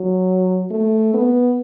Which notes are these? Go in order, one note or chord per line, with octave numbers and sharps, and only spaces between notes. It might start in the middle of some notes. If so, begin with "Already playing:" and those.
Already playing: F#3
A3
B3